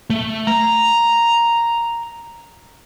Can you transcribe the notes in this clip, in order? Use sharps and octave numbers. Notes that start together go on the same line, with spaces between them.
A3
A#5